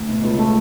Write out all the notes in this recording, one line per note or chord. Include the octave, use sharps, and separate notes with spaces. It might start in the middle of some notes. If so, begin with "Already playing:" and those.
Already playing: D2
B2
C#2
A3